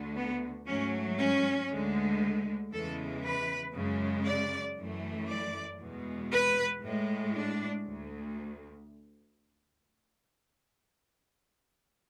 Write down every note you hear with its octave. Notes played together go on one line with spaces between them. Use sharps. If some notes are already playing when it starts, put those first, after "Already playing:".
Already playing: D2 D3 A3
B3
G#2 F#3 A3 C#4
C#4
D2 D3 G#3
E2 C#3 E3 G#3 A4
B4
F#2 C#3 G#3
D5
F#2 E3 A3
D5
E2 B2 G#3
B4
A2 G#3
D4
D2